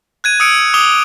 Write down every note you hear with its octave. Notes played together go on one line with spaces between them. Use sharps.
F#6 G#6 D#7
D#6 E6 C#7 D7
D6 D#6 F7 G7